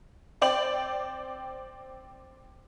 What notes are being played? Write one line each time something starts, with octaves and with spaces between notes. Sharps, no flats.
C4 D5 G5 F#7